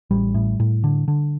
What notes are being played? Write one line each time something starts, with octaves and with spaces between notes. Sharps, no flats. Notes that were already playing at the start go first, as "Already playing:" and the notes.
A1 G3
A2
A2
D3
D3